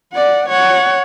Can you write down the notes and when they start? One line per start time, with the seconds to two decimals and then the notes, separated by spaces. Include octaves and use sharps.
0.13 D5 F#5
0.49 C#5 F#5